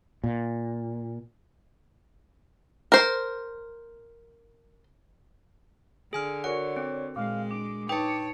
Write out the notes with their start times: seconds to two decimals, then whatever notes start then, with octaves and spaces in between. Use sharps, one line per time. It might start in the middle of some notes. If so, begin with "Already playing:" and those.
0.24 A#2
2.92 A#4 C5
6.13 D3 G#4 G#5 F6
6.44 F#4 A#4 C#5 D5 F#5
6.76 C4
7.16 A#2 G#3 F5
7.51 D4 D6
7.89 D#4 B4 C#5 G5 A5